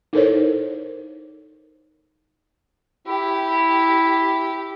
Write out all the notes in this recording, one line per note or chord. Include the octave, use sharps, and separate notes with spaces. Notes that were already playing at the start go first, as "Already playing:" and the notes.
D#4 E4 A4 A#4 C5 C#5
E4 G4